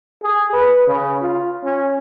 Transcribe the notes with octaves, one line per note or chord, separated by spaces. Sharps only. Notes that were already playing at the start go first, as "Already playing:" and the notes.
G#4
B4
C#3
F4
C#4